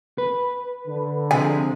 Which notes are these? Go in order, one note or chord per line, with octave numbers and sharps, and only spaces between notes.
B4
D3
C3 F3 G#3 G#5